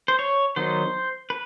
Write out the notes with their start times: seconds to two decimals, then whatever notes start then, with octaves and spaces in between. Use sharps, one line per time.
0.08 C5
0.19 C#5
0.56 D#3 F#3 B3 D#4 C5
1.30 B4